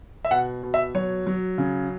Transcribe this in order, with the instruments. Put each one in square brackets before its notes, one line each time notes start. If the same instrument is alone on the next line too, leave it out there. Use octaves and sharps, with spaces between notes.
[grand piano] E5
B2 F#5
B2
E5
F#3 C#5
F#3
C#3